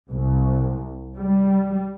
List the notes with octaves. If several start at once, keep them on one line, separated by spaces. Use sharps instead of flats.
C2
G3